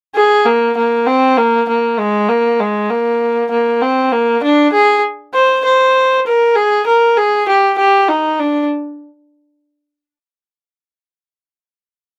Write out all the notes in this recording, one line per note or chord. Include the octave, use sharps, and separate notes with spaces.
G#4
A#3
A#3
C4
A#3
A#3
G#3
A#3
G#3
A#3
A#3
C4
A#3
D4
G#4
C5
C5
A#4
G#4
A#4
G#4
G4
G4
D#4
D4